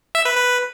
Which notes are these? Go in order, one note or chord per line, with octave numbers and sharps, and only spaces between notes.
E5
B4
B4